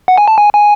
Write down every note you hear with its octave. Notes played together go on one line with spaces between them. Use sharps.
F#5
G#5
A5
G#5
G#5